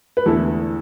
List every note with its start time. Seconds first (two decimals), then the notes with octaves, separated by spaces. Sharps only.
0.17 B4
0.26 E2 D3 A3 E4 A4